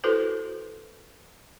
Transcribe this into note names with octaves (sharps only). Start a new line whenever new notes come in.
E4 F#4 A4 B4 C5